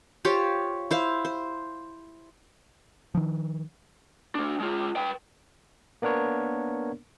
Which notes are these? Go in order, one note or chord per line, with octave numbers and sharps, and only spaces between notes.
F4 G4 C5 C#5
E4 C5 F5
C5
D#3 F3
A3 D4
G#3 F4
B4 G5
A#3 B3 D4 A#4 C#5